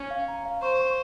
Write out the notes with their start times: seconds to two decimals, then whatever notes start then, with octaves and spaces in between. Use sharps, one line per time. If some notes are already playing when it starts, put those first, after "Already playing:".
Already playing: C#4 C#6
0.11 F5
0.28 A#5
0.46 F5
0.62 C5 C#6
0.79 C#6